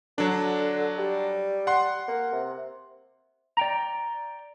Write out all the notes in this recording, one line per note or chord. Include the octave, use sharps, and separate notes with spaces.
D3 F#3 D4
G3
F#5 C6
A#3
C3
D5 G5 A#5